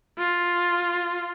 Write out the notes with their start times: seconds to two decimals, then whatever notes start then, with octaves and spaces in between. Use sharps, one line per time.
0.19 F4